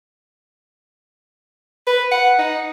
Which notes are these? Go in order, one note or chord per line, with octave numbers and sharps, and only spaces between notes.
B4
F#5
D#4